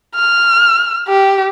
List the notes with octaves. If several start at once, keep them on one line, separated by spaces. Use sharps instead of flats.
F6
G4